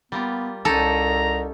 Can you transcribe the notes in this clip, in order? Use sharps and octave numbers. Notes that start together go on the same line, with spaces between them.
G3 A#3 B3 F4
C2 C#4 D#4 G4 A4 A#5